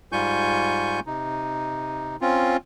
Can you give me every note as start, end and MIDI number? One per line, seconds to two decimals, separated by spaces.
0.12 1.00 44
0.12 1.00 55
0.12 1.00 65
0.12 1.00 80
0.12 1.00 85
0.12 1.00 91
1.06 2.16 48
1.06 2.16 63
2.21 2.57 60
2.21 2.57 61
2.21 2.57 65